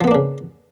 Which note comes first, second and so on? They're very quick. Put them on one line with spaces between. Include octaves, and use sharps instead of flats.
F3 B3 A#3 D4 C#3